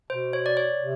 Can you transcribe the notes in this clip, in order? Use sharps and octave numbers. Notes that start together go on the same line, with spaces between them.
B2 C5
C#5
D5
C#5
C3